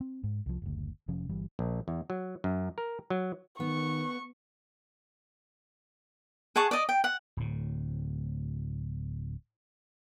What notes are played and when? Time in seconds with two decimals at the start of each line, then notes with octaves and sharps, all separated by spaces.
0.01 C4
0.23 G#2
0.46 C2 F3
0.62 F#1 D2
1.08 F1 C3 F3 C#4
1.29 G1 E3 G3
1.59 A#1
1.88 E2
2.10 F#3
2.44 F#2
2.78 A#4
3.10 F#3
3.60 D#3 B3 C#6
6.56 G#4 F#5 A5 C#6
6.71 D5 D#5
6.89 G5
7.04 F#5
7.37 D1 A2